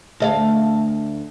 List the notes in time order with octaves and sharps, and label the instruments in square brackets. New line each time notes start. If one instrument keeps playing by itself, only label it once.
[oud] D2 D#5 F5